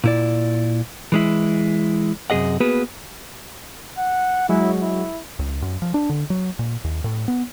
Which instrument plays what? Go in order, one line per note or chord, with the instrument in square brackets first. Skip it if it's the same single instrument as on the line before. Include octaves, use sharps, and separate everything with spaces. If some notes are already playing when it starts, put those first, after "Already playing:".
[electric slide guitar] A#2 E4 D5
E3 G#3 E4
F#2 C3 A3 G#4 D#5 F#5
A#3 B3 F#4 G#4 B4
[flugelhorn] F#5
[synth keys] F#3 G#3 F#4 [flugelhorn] E4
[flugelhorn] E4
[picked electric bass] C#2
F#2
F3
D4
D3
F#3
A#2
D#2
A2
B3